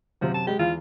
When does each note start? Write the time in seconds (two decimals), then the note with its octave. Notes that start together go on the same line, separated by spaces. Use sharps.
0.21 F#2 C3 F3
0.34 A5
0.47 G#3 G4
0.59 E2 F4 F5